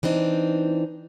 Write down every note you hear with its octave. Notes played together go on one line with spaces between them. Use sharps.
E3 C4 D4 D#4